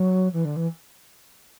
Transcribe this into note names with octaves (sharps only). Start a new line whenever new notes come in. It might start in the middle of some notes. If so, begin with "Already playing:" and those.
Already playing: F#3
E3
D3
E3